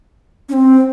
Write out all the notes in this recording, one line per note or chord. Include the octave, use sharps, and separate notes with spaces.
C#4
C4